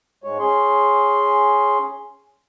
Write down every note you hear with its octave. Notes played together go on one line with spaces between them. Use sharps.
G#2 G#3 C#5
C#4 G#4 C6